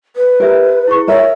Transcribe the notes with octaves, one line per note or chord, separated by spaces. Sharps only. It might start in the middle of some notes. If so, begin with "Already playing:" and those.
B4
G4 A#4 E5
E4 G#4 C#6
A#4 C#5 E5